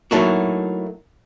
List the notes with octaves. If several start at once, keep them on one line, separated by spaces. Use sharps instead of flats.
F#3 A3 A#3 D#4 E4 F#4